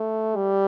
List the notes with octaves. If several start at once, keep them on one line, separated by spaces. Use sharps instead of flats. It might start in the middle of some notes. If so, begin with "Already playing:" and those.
Already playing: A3
G3